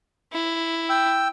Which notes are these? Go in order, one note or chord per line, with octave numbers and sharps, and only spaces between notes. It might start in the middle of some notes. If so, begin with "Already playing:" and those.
E4
G5 E6